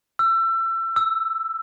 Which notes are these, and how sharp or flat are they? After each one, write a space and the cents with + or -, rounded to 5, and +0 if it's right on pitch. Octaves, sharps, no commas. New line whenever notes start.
E6 +30
E6 +5